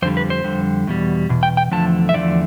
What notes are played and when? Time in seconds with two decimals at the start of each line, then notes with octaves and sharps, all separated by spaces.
0.02 F2 D3 G3 C5
0.17 B4
0.30 C5
0.44 F2 D3 G3
0.87 E2 B2 G3
1.29 E2 B2
1.43 G5
1.57 G5
1.72 E2 D3 F3 A3 A5
2.09 E5
2.14 E2 D3 F3 A3 D5